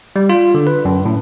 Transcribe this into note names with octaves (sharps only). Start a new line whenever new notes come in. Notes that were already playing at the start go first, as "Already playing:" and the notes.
G3
F4
D3
B4
F#2
A2